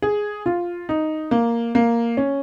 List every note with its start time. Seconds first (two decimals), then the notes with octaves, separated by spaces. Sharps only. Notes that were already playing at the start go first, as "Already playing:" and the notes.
0.02 G#4
0.46 F4
0.89 D#4
1.31 A#3
1.75 A#3
2.17 C#4